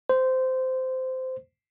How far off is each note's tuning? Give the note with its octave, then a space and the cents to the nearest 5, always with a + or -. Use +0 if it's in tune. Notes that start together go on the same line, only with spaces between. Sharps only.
C5 -15